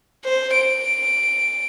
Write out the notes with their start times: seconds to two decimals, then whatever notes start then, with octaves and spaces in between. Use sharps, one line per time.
0.24 C5
0.53 D7